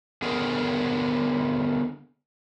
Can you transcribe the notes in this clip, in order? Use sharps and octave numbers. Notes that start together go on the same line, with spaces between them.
D3 B3 G#4 A#4